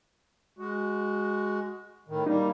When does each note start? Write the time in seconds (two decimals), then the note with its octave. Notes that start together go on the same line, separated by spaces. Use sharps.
0.59 G#3 F#4
2.08 A2 D#3
2.27 G3 A#3 D#4